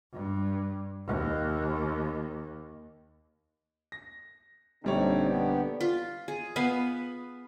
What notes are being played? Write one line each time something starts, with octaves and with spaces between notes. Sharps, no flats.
G2
D#2
A#6
A#1 D3 G3 C4 D#4 C#5
D3 B3 G4
F4
G#4
B3 B4 F5